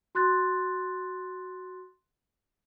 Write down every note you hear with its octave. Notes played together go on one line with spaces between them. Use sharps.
F#4 C6 F#6 A6